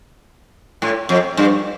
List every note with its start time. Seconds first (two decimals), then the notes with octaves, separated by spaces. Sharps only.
0.82 A2
1.09 F2
1.37 G2